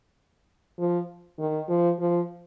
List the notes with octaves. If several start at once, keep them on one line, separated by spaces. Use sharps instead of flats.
F3
D#3
F3
F3